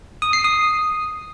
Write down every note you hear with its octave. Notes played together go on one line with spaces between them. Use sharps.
D#6
C7
D#6